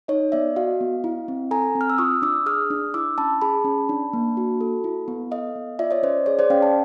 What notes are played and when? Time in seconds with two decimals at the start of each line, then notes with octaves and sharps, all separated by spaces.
0.08 D#4 C#5 D#5
0.32 B3 D5 E5
0.56 F#4 D#5 F5
0.81 B3
1.04 E4
1.28 C4
1.51 A4 G#5 A#5
1.75 C4
1.81 F6
1.90 E6
1.98 F4 C#6 D#6
2.22 D4 D6 E6
2.46 G#4 D#6 F6
2.70 D4
2.94 E4 D6 E6
3.18 C#4 A5 B5
3.41 G#4 A5 B5
3.65 C#4
3.89 D4
4.13 A#3
4.37 F#4
4.61 A4
4.84 E4
5.08 B3
5.31 A4 D#5 F5
5.56 B3
5.79 F4 D5 E5
5.91 C#5 D#5
6.03 C#4 C5 D5
6.26 G#4 C#5
6.39 C5 D5
6.50 C#4 F5 G5
6.62 G5 A5